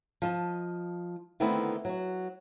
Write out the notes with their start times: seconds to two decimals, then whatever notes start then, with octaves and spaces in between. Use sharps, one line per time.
0.22 F3 D#5 A5
1.40 D3 D#3 A3 B3 C4 E4
1.85 F#3 F#4